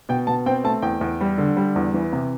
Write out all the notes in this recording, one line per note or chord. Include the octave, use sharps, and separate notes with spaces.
B2 G5
B2 A5
C4 G5
A3 A5
E2 G5
E2
G3
D3
G3
E2
E3
C3